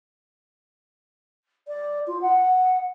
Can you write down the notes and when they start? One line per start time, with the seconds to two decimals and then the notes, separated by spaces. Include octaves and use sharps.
1.68 D5
2.07 F4
2.22 F#5